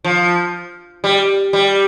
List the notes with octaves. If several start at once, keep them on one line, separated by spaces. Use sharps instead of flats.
F3
G3
G3